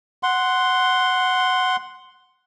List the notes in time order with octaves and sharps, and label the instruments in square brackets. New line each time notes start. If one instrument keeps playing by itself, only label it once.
[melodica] F#5 C6